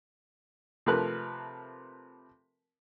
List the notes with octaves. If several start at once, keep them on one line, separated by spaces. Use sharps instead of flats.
C3 F3 A3 A#4 B4 F#6